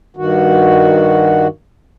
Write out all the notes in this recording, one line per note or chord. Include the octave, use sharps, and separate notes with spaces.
G2 D#3 F#4